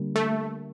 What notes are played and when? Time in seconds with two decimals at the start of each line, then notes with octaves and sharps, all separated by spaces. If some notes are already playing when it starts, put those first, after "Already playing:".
Already playing: D3 G3 A#3
0.16 A3